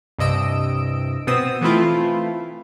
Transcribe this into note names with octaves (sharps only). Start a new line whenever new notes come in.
C2 G2 C3 D#5 E6 D7
B2 B3 C4 D#6 E6
E3 A3 C4 E4 F4